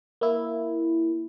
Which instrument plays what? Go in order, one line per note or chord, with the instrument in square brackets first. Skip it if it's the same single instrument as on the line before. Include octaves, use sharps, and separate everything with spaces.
[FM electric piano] A#3 E4